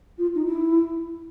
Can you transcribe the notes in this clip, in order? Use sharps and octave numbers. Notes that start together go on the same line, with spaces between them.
F4
D#4
E4